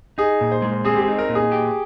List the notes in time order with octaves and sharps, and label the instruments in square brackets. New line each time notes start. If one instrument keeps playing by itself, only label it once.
[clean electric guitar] D#4 [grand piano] G#4
[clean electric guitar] A#2
[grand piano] C5
[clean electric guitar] G#3
[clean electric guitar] C4 [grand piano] G#4
[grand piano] G4
G#4
[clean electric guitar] D#4
[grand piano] A#4
[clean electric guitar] A#2
[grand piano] G#4
[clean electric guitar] G4